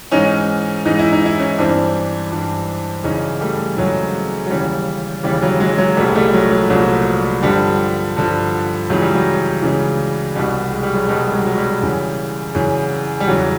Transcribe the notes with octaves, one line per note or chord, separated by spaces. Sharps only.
G#2 E3 C#4 D#4
G#2 E3 D#4
E4
D#4
E4
C#4 D#4
G2 E3 C4 D4
G2 E3
F#2 C#3 E3 C#4 D#4
G3 A3
F#2 C#3 E3 F#3 G#3
F#3
D#2 C#3 E3 G3
D#2 C#3 E3 G3
F#3
F#3 G#3
F#3 G#3
C2 A#2 F3 G3 A3
G#3
G3 A3
F#3 G#3
F#3
C2 A#2 F3 F#3
G2 D3 F3 G3
G2 D3 F3
C#2 C#3 E3 F#3
G3
F#3
C#2 C#3 E3
C2 B2 G3
G#3
G3
F#3 G#3
C2 B2 G3
F#3 G#3
F#3
G3
F#2 C#3 E3
F#2 C#3 E3
G3
E2 C#3 E3 F#3